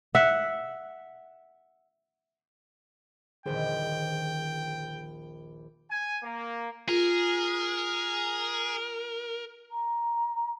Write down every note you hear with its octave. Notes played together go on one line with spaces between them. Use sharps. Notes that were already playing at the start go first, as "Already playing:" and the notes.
E5 F#5
D#1 A#1 D3 D#3 G#4 C5 G5
G#5
A#3
F4 G#4 A#4
A#5